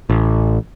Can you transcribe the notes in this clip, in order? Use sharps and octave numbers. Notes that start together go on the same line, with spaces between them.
A1